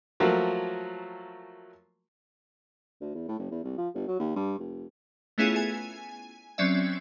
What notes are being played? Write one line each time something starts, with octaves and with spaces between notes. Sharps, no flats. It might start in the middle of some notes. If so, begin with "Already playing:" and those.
F3 F#3 A3 A#3 F#4
D2
E2
A2
F#1
E2
C2
F3
G1
F#3
D#2
G2
F1
A3 B3 C#4 E4 F4 G#4
G#5
F#3 C4 C#4 D5 E5